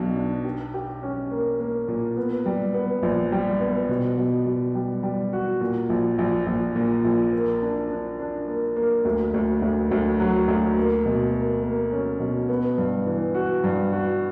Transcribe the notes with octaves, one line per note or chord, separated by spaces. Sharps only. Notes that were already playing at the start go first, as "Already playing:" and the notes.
Already playing: B1 B2 D4
D4
G4
G4
C#4
A#3
A#3
A#2
B3
G3
B3
A#1
G3
B3
B2
B2
B2
G3
G3
F#4
A#2
A#1
A#1
A#1
A#2
A#1
A#3
D4
D4
D4
A#3
A#3
D2
D2
D2
D2
F#3
D2
A#3
B2
A#3
A#3
C#4
B2
B3
G2
E3
F#4
G2
F#4